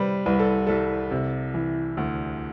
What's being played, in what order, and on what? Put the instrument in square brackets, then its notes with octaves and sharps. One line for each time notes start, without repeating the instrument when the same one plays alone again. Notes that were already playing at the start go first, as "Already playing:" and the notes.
Already playing: [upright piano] C3 G3 B4 C5
C2 B4
A4
C2 A4
C3
E3
D2